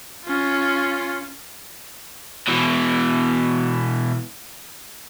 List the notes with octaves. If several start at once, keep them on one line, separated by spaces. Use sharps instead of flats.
C#4 F4
B2 E3